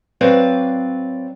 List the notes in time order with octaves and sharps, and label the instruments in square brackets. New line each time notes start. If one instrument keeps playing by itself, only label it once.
[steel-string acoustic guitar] F#3 C4 B4 D5 F5